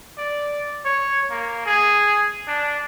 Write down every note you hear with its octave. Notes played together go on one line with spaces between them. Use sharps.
D5
C#5
A#3
G#4
D4